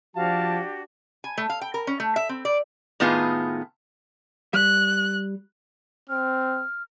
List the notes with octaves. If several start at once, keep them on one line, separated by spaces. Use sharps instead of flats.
F3 D4 F#4 G4 F5 A5
G#5
A3
F5
G5
A#4
C#4
A3
E5
C4
D5
A2 D#3 B3 F4 G#4
G3 F#6
C4 F6